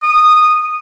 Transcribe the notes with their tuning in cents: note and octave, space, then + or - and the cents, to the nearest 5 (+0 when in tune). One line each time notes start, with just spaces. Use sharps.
D#6 -10